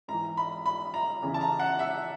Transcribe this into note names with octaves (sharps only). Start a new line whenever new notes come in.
G#2 E3 A#5
B5
B5
A#5
E2 C#3 E3
A5
A#5
F#5
E5